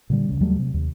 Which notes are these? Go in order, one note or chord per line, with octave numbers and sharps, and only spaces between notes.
A#2 D3 G3
D2 C#3
D#2 F#3 G3 A3
C3
D#2